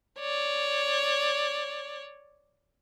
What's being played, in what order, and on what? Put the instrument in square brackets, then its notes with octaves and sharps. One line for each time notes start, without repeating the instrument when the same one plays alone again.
[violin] C#5 D5